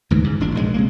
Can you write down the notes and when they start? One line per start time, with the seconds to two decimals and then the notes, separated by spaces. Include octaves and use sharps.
0.11 D2 G#2 E3
0.24 G#2 C#3
0.40 E1 A1 D4
0.55 A#1 G#2 C#3 G#3
0.74 C3 G#3 A#3